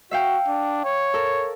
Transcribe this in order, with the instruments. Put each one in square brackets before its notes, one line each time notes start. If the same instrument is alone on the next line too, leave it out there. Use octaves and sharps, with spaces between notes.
[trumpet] F#4 [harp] E5 F5 G5
[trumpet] D4
C#5
[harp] A4 A#4